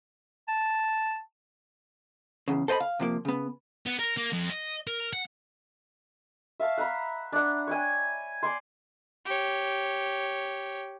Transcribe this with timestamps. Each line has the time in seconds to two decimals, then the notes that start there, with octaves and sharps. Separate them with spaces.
0.48 A5
2.48 E2 C#3
2.68 A4 C5 D#5 G#5 B5
2.80 F5
2.99 C3 F3 A#3
3.25 C#3 B3
3.86 B3
3.99 A#4
4.18 A#3
4.33 F2
4.50 D#5
4.87 A#4
5.13 F#5
6.60 E5 F5 A5 C#6
6.78 F#5 A#5 B5
7.32 D4 F#5
7.67 C#5 G5 G#5
8.43 D5 G#5 C6
9.26 G4 C#5